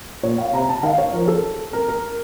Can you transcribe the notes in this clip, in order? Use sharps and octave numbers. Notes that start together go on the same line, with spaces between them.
A#2 C#5
F5
C3 A#5
A5
D#3 F5
C#5
F3 A#4
A4
C4 A#4
A#4